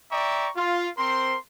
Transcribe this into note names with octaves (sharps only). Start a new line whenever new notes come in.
D5 E5 G5 A#5 C#6
F4
C4 A#4 C5 C6